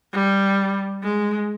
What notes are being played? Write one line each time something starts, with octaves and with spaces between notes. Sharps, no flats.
G3
G#3